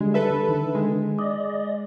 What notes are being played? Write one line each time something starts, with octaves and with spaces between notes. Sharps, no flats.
D3 G3 G#3
A4 B4 E5
D3 D#3
G#3
D5 D#5